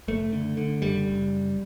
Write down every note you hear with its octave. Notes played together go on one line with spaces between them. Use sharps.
F#1 A3
D3
D3
F#1 G3
F#1